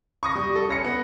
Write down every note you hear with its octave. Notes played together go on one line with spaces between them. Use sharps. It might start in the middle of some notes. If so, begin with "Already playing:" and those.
C#6 D#6 A#6
G3
A4
C#4 A#6 C#7
B3